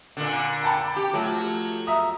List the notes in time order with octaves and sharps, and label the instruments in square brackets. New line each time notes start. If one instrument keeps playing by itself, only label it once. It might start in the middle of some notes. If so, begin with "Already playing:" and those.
[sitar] A#2 D3
[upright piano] G5 A5 B5
[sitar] G4
[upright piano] F3 A3 [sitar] F#3
[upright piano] E5 A#5 D#6